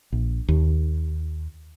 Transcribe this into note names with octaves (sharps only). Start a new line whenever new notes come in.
A#1
D#2